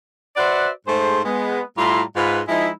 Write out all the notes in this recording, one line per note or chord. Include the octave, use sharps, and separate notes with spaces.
F#4 B4 C5 D5 E5 F#5
G#2 A3 G#4 C5
G#3 B3
A2 G3 E4 F4 A#5 C6
G#2 F4 B4
F3 G#3 D#4 E4